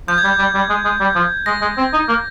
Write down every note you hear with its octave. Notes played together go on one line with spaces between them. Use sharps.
F3 G6
G#6
G3 G6
G3
G3
G#3
G#3
G3
F3
G#3 A#6
G#3
C4
D#4
A#3